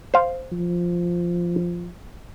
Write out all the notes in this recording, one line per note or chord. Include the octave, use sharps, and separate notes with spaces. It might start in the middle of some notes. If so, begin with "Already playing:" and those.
C5 F5
F3